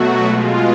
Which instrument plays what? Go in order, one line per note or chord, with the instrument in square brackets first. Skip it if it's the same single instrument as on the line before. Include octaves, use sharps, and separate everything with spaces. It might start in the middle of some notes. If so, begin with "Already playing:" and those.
Already playing: [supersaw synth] B2 F#3 A3 F#4
B2 G#3 F4